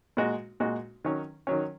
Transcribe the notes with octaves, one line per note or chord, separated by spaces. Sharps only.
A#2 G#3 F#4
A#2 G#3 F#4
D#3 F#3 C#4
D#3 F#3 C#4